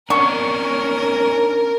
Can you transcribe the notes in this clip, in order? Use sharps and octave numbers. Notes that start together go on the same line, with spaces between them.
C#4 D4 A#4 C#6